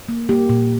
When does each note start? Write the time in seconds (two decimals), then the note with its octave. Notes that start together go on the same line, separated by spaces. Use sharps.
0.09 A#3
0.29 A#3 G4
0.49 A#2